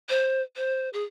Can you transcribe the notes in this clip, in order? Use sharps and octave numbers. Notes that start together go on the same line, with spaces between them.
C5
C5
G#4